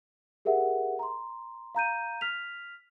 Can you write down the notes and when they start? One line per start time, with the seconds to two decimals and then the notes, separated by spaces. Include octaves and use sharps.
0.45 G4 G#4 A#4 E5 F#5
0.99 A#5 C6
1.75 F5 A#5 G6 D#7
2.21 F6 B6 F7